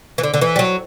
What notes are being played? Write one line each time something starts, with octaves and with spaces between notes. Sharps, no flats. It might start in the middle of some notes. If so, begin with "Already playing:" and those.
E3
D3
D3
E3
G3
F#3